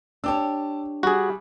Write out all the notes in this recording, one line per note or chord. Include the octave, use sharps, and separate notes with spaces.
D4 G4 C#5 A5 D6 E6
G3 F#4 G#4